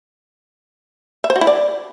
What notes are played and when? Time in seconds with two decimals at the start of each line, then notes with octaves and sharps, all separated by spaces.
1.24 E5
1.30 C5
1.36 F#4
1.41 E4
1.47 D5